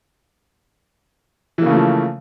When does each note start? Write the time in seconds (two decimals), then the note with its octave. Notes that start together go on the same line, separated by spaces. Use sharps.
1.58 E3
1.62 A#3
1.66 C#3
1.70 A3
1.74 F3